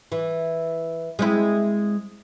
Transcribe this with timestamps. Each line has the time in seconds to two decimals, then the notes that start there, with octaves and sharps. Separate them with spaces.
0.12 E3
1.19 G#3 C4 E4